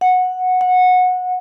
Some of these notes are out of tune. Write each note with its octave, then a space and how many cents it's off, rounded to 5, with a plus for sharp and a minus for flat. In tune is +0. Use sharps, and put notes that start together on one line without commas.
F#5 -10
F#5 -20